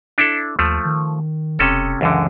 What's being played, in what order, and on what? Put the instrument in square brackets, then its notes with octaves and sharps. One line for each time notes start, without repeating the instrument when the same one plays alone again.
[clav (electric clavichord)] D4 E4 A4
[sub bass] D#2 [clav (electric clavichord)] F3 A3
[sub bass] D#3
[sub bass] E1 [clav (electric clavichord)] C3 C#4 A4
[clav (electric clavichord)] C#2 F#2 D3 [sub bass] E3